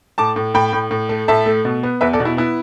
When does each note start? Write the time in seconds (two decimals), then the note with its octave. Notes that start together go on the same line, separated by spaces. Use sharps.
0.18 A2 A5 D6
0.36 A2
0.54 A2 G5 B5
0.73 A2
0.91 A2
1.09 A3
1.28 A2 E5 A5
1.46 A3
1.65 B2
1.83 B3
2.01 E2 B4 E5
2.13 A4 D5
2.20 B2
2.25 E4
2.37 B3 E4